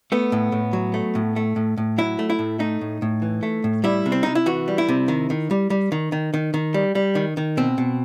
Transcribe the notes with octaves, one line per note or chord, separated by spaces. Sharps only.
A3 B3
A2
A2
F#3
A3
A2
A3
A2
A2
F#3 E4
A3
E4
A2
A3 D#4
A2
A2
E3
A3
A2
G3 E4
C3
C4
C3 D#4
E4
E3 F#4
G3
E4
C3
D#3
D#3
G3
G3
D#3
D#3
D#3
D#3
G3
G3
D#3
D#3
B2 C4
B2